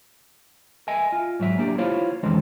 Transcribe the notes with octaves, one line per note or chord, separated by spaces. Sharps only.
D#5 E5 G#5
F4
G#2 F#3 E5
A#3 D4 G4
E4 F4 C5 C#5 F5
F2 D#3 E3 G#3 C4 C#4